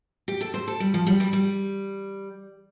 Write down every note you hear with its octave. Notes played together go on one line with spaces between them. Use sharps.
G4
A4
C5
A4
G3
F3
G3
G3
G3